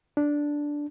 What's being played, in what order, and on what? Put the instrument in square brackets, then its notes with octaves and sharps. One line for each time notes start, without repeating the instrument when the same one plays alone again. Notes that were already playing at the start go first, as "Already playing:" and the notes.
[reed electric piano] D4